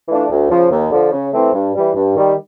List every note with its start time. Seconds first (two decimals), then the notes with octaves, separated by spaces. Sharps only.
0.08 E3 A3 D4 F4
0.30 D2
0.49 C#3 F3
0.71 D#2
0.91 D3 F3
1.12 C#3
1.33 E3 A3 C4
1.53 G2
1.74 E3 G3
1.95 G2
2.16 D#3 G3